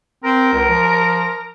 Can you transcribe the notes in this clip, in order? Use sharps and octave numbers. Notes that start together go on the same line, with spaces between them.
C4 A#4
C#2
F3